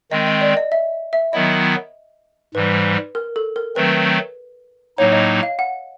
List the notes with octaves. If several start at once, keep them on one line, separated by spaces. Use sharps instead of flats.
D#3 G#3 C4 D#5
D#5
D5
D#5
E5
E5
D#3 F#3 B3 E4 D#5
G#2 E3 G3 B4
A#4
A4
A#4
D#3 F#3 A3 C4 B4
A2 F#3 A#3 D#4 C#5
D#5
F5
F#5